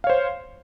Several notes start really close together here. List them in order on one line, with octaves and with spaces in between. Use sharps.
F5 C#5 C5